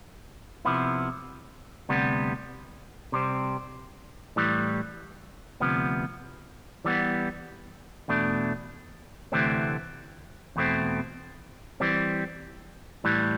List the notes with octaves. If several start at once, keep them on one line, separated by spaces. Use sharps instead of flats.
C3 F3 B3 E4
D2 C3 G3 B3
C3 G3 C4
A2 E3 G3
D2 C3 F3 B3
E3 G3 B3
E2 B2 A3 D4
D2 C3 E3 A3 C4
E2 B2 A3 C4
E3 G3 C4
A2 E3 G3